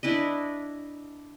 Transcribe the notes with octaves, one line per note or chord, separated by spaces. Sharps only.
D4 E4 B4 D#5